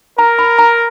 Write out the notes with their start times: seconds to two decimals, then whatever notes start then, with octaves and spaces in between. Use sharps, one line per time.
0.19 A#4 A#5
0.39 B5
0.59 A#5